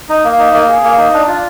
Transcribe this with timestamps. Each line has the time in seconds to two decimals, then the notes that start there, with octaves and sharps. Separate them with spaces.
0.09 D#4
0.24 A#3
0.38 D#4
0.53 A#3
0.69 G#4
0.83 A#3
0.98 D#4
1.14 D4
1.27 F4